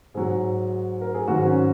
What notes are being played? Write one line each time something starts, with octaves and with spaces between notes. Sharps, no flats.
G#2 F#3 G#4
A#4
G#4
G#2 D#3 F#3 F#4
C#4